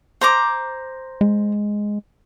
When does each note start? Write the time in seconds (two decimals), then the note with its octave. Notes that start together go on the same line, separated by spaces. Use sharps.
0.21 C5 A#5 D6
1.21 G#3